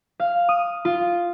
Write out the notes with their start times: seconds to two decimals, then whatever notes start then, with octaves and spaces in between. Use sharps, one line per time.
0.20 F5
0.49 D#6
0.85 F4